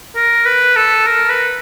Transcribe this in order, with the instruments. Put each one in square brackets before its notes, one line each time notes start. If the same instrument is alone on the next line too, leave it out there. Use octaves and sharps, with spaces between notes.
[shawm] A#4
B4
A4
A#4
B4